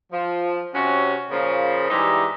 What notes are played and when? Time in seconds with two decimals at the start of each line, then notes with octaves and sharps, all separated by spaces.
0.12 F3
0.74 C3 C#4 F#4
1.31 A#2 C#3 F3
1.89 G#2 E3 G3 D#4 G4 E5